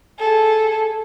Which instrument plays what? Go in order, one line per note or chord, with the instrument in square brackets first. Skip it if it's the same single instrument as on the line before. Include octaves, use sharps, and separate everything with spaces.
[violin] G#4 A4